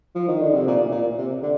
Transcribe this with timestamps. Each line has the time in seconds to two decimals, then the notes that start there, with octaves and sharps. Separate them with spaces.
0.15 F3
0.28 D#3
0.41 D3
0.54 C3
0.67 A#2
0.92 A#2
1.18 C3
1.42 D3